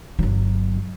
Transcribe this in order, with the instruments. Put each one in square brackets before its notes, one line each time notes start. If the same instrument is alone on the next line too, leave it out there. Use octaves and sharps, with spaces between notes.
[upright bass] G1 F#3